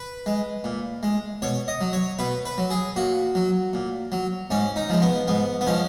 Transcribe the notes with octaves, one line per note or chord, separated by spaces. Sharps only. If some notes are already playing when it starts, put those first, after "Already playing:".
Already playing: B4
G#3
A#2
G#3
B2 C#5
D#5
F#3
C#5
B2 B4
B4
F#3
G#4
A#2 F#4
F#3
A#2
F#3
G#2 C#4
D#4
F3 G#3
B3
G#2 B3
B3
F3 G#3 C#4